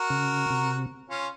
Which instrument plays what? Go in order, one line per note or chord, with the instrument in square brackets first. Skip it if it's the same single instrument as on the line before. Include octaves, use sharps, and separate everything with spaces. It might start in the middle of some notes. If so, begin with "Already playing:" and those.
Already playing: [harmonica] F#4 A#4
[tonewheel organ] C#3
C3
[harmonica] C#4 F4